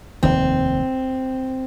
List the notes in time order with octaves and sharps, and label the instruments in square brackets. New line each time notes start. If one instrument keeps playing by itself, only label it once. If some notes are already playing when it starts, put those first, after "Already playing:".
[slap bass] F1 D#2 D#3 [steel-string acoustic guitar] C4